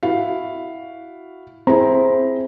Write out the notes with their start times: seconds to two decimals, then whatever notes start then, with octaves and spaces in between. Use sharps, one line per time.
0.03 E4 F#4 F5
1.67 C4 E4 G#4 A#5